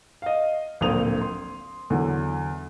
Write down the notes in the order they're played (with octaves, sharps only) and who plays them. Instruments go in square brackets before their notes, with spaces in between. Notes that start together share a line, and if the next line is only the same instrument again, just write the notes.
[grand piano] D#5 F5
D1 A#1 A#3 C4 D#6 F7
C6
E2 D3 F#3